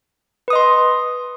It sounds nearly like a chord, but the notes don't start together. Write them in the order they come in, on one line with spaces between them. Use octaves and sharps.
B4 D#6 D#5 C6